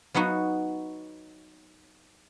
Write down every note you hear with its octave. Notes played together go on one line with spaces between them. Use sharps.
F#3 B3 D#4 F#4